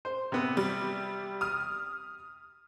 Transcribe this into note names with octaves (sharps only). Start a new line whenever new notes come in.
C5
C3 B3
G3
D#6 F6